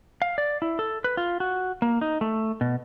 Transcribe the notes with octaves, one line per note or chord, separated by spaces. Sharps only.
F5
D5
E4
A4
B4
F4
F#4
A#3
D#4
A3
B2